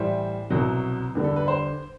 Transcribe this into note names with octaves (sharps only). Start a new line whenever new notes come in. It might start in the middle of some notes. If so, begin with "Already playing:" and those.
Already playing: A2 E3 G3 C5
C2 B2 F#3
E2 D3 G3
A4
B4
C5